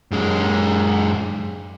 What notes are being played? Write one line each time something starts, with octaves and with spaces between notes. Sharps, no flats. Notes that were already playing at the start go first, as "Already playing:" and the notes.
F#2 G#3